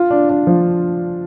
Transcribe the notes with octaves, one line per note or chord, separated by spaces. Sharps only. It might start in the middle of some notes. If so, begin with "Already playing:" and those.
Already playing: F4
D4
D4
F3